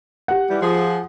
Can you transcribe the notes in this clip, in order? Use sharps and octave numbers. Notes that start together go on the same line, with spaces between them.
G4 F#5
E3 G3
F3 G#4